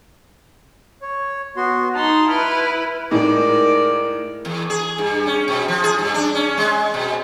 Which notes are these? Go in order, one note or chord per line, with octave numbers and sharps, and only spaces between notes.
C#5
B3 F#4 C6
D#4 A5 C6
E4 B4 B5 F6
A2 G#3 D#4 A#4 D5
E2
G#4
G2
C#4
B2
F3
G#4
G2
D4
C#4
G#3
B2